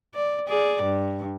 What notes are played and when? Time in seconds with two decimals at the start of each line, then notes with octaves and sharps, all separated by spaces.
0.15 D5
0.48 G#4 D5
0.83 G2